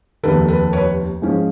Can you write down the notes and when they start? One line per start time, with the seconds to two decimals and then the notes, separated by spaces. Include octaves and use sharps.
0.23 F1 D#2 D#3 A4 B4
0.48 A4 B4
0.73 B4 C#5
1.22 G#2 F3 G#3 C#4